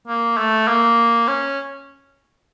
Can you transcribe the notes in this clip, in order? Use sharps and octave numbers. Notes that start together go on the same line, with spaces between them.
A#3
A3
A#3
C#4